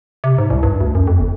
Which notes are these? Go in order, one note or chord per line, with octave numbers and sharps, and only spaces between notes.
C3
G#2
C2
G2
D2
F#2
F2
G1